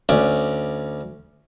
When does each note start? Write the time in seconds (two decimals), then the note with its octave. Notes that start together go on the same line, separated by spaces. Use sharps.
0.09 D2 C#4 D5